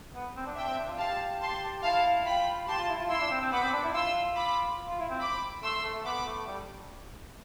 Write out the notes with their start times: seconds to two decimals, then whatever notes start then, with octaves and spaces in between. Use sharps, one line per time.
0.15 B3
0.36 C4
0.46 D4
0.57 D4 E5 G5
0.67 C4
0.78 D4
0.89 F4
0.99 G4 F5 A5
1.41 A5 C6
1.83 E4 F5 A5
2.25 F4 G5 B5
2.68 G4 A5 C6
2.78 F4
2.89 E4
2.99 F4
3.09 E4 C6 E6
3.21 D4
3.31 C4
3.42 C4
3.52 B3 B5 D6
3.63 C4
3.73 D4
3.84 E4
3.94 F4 C6 E6
4.36 B5 D6
4.88 F4
5.00 E4
5.10 C4
5.21 B5 D6
5.63 A3 C6 E6
5.84 A3
5.94 A3
6.05 B3 B5 D6
6.26 A3
6.47 G3